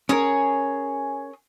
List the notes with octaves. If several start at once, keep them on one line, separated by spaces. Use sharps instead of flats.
C#4 G#4 A#4 C#5